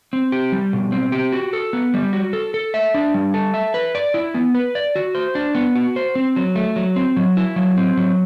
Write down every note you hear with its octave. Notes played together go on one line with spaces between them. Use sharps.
C4
G4
G3
B2
C4
G4
F#4
A4
B3
G3
F#4
A4
A4
E5
D4
G3
A4
E5
B4
D5
E4
B3
B4
D5
F#4
C5
D4
B3
F#4
C5
C4
F#3
A3
F#3
C4
F#3
E4
F#3
C4
F#3